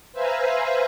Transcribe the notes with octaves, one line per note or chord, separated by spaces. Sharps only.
B4 C5 E5 F5 G#5 A#5